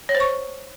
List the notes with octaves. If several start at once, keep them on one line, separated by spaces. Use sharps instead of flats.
C#5
C5
C#6